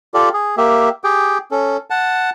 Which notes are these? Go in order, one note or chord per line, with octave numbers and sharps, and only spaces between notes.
F4 G4 A4 D5
G#4
A#3 G4 E5
G4 G#4 G5
C#4 A4
F#5 A5